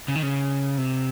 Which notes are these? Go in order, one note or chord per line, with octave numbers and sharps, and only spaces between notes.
C#3
D#3
C#3
C3